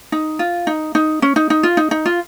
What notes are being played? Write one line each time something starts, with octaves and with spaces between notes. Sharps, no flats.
D#4
F4
D#4
D#4
C#4
D#4
D#4
F4
D#4
D#4
F4